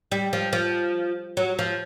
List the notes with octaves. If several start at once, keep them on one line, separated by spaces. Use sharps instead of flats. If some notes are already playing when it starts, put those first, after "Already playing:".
G3
F3
F3
F#3
F3